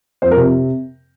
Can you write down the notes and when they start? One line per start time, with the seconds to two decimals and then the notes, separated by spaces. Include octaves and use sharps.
0.22 F2 C5
0.31 A#4
0.36 C3